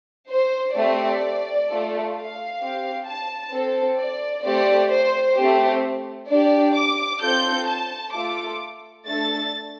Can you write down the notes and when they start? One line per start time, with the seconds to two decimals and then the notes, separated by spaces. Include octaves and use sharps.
0.29 C5
0.75 A3 C4 G4 D5
1.67 A3 F4 A4
2.13 F5
2.59 C4 G4
3.06 A5
3.53 C4 A4
3.99 D5
4.44 A3 C4 G4 D5
4.91 C5
5.36 A3 C4 G4
6.29 D4 G4 D5
6.75 D6
7.21 C4 F4 A4 G6
7.67 A5
8.13 A3 F4 A4 D6
9.06 A3 D4 A4 A6